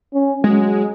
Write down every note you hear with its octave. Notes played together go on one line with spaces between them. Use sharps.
C#4
F#3 G#3